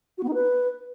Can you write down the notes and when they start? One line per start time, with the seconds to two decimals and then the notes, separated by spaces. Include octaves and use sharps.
0.18 F#4
0.23 B3
0.28 D#4
0.34 B4